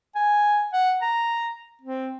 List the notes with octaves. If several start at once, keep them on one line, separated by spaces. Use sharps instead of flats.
G#5
F#5
A#5
C4